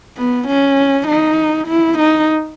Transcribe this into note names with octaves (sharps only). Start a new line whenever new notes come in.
B3
C#4
D#4
E4
D#4